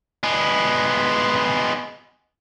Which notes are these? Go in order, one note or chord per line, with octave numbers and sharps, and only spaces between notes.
G#3 B3